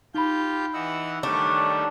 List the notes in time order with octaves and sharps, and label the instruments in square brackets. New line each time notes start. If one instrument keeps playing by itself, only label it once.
[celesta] D#4 B5 [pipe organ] F4 G4 G6
[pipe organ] E3 F#5 [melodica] D#5 E6
[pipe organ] D#3 G3 A3 [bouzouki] D4 [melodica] C#5